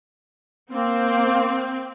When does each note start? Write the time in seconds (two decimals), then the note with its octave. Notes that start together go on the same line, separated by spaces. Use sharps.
0.72 A#3 C4